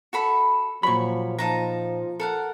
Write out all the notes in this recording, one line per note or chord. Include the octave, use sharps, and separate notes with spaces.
F#4 A4 B5
A#2 F3 F#3 C#5 B5 C#6
F3 D#4 A5 A#5
A4 A#4 F#5